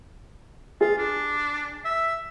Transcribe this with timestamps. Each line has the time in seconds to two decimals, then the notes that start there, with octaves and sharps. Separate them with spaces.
0.81 F4 G#4
0.98 D4
1.85 E5